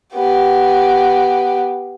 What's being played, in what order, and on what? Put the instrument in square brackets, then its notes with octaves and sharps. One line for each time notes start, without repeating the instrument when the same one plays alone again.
[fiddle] B3 G4